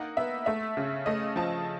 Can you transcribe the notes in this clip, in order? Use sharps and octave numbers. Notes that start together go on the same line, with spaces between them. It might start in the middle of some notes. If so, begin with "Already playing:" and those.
Already playing: A#3 D#4 F#5
B3 E5
A3 E5
C#3
A3 D#5
F3 A5